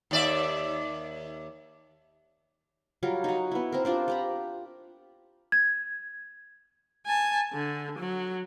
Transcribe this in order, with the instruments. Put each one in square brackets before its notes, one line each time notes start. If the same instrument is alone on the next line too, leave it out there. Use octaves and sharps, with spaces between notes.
[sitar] D#2 D5 E5
[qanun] F#3 G3 F4 A#4
D#4 F#4
B3 E4
C4 A#4
C4 D4 F4 G4
G4 A#5 B5
[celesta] G#6
[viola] G#5 A5
D3
F#3